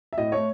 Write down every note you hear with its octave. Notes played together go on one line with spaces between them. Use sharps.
E5
A2 D#5
A3 C#5